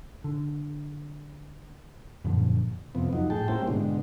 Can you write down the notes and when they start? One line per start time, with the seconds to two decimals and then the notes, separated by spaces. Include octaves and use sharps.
0.24 D3
2.24 F#2 A#2 D3 F3
2.95 F2 C3 B3
3.13 F2 F#3 D#4
3.30 A2 G#4 G5 A5
3.48 G3 A#3 C#4 E4 C5 G5
3.68 G#2 B2 D3